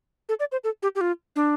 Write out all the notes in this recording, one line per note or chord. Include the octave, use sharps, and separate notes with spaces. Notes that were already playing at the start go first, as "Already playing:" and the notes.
A4
D5
C5
A4
G4
G4
F4
D4